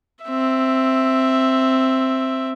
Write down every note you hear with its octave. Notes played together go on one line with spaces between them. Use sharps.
C4 E5